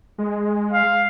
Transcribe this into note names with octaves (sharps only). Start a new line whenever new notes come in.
G#3
F5